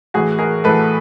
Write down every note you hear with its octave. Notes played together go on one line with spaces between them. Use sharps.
A2 E3 F#4 G#4
G#4 A#4
A2 E3 A4 B4